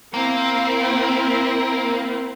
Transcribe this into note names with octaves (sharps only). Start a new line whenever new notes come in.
A#3 C4 E4